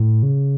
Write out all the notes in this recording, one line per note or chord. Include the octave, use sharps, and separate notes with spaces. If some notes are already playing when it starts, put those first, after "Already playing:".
Already playing: A2
C#3